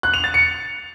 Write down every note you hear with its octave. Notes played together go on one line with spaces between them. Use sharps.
F#6
F7
A6
C#7